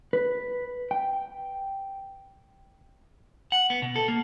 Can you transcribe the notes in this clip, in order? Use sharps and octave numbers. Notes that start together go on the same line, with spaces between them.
B4
G5
F#5
B3
B2
A4
A#3